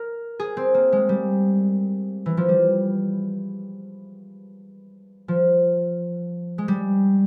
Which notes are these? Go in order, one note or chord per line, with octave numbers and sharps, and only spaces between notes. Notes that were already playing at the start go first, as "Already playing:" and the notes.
Already playing: A#4
G#4
C4
A#3
G#3
G3
E3
F3
G3
F3
G#3
G3